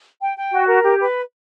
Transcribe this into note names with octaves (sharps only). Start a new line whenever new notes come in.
G5
G5
F#4
A#4
G4
B4